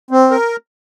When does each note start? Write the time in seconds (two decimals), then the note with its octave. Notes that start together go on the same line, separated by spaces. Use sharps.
0.11 C4
0.31 A#4